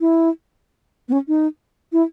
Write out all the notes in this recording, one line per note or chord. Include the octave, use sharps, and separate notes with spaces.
E4
B3
C#4
D#4
E4